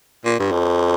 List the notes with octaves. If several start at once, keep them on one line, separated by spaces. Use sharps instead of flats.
A#2
G2
F2